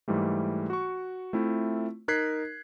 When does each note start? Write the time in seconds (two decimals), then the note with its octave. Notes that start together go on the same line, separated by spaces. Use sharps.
0.08 G#2 E3 G3 A3
0.70 F#4 C#6
1.33 A3 C4 E4 F4
2.08 D#4 A#4 F#6 G#6 B6 C7